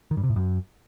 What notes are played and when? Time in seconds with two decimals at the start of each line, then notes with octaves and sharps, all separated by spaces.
0.11 D#3
0.17 G2
0.23 C3
0.30 A2
0.36 F#2